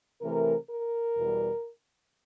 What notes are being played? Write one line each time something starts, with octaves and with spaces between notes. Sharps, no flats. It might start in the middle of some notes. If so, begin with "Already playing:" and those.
C3 E3 A3 A#4
A#4
E2 B2 G3